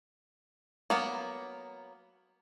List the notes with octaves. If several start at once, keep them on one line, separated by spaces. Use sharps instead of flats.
F#3 A#3 B3